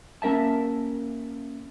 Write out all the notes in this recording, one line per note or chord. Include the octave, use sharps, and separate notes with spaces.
A#3 C#4 A#4 E5 A5